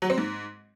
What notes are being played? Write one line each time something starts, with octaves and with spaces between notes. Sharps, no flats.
F#3
C4
G#2